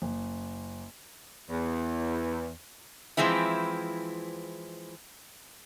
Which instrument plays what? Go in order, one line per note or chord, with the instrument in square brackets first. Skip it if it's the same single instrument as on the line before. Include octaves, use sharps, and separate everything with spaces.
[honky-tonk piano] F#1
[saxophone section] E2
[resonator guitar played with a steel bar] E3 F3 G#3 C4 E4